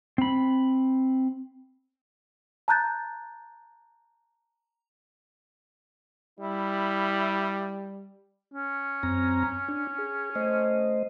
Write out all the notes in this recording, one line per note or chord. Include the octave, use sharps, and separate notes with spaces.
C4 B5
A5 A#5 F#6 G6 A6
G3 E4
C#4
F#2 C4 A#5
D4
G#4
A3 C5 D#5